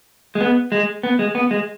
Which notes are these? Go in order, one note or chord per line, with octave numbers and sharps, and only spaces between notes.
G#3
B3
G#3
B3
G#3
B3
G#3